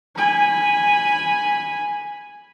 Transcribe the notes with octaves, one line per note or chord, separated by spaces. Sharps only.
G#5 B5